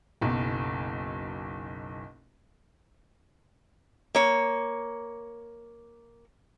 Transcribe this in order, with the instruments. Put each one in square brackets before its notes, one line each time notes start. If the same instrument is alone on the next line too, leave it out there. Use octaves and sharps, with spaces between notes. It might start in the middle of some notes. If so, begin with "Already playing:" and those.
[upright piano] F#1 B1
[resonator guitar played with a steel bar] A#3 C#5